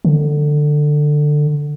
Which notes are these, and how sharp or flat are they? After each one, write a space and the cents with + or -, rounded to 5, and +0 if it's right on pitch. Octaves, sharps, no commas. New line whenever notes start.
D3 +15